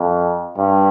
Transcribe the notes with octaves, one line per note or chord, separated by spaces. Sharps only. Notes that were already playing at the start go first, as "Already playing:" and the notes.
Already playing: F2
G2